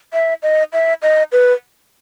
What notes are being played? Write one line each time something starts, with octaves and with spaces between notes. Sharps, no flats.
E5
D#5
E5
D#5
B4